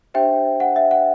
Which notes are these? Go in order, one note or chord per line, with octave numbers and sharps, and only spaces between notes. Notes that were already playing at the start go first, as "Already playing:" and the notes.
D4 G4 C5 E5 G5
F#5
E5
F#5